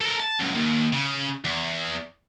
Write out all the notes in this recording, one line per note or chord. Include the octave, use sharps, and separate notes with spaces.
A4 A#4
A5
C#2 F#2
D#2
C#3
E2